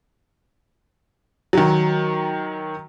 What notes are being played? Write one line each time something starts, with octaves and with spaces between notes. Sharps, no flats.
D#3 F#3